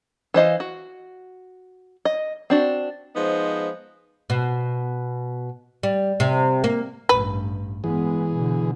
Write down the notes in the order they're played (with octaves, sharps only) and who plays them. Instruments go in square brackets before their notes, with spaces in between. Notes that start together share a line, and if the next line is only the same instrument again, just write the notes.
[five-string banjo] E3 C5 D#5 F5
F#4
D#5
C4 D4 F#4
[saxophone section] F3 G#3 B3 D#4 C5
[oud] B2
G3
C3
A#3
[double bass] A1 G2 [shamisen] B4
[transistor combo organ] E3 G#4 [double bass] G#3 B3
[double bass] B2 D3